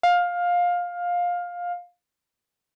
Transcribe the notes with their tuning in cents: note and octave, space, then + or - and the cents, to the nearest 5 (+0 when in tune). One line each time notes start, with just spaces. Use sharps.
F5 +15